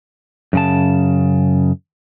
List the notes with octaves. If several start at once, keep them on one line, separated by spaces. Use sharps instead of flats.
F#2 C#3 A5